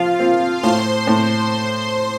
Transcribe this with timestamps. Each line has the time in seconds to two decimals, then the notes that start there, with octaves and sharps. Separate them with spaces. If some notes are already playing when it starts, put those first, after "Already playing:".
Already playing: F3 F4 F5
0.20 C4
0.63 A2 C5 C6
1.07 A2